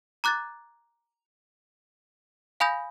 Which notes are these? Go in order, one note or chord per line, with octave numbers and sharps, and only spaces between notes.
A#5 D6 F#6 G#6 A6
F5 G#5 B5 D#6 G6 A#6